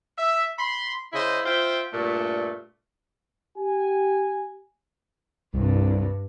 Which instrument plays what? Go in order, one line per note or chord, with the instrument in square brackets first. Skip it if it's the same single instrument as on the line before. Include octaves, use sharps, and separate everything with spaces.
[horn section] E5
B5 C6
C#3 E4 C5 D#5
F4 C5 E5 G5
G2 A#2 A3
[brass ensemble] G4 G#5
[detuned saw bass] C2 [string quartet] G2